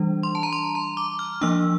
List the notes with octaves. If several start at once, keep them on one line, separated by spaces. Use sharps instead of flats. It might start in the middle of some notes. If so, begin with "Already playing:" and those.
Already playing: E3 G3 D4
C6
A5
A#5
C6
A#5
D6
F6
F3 A#3 D4 E6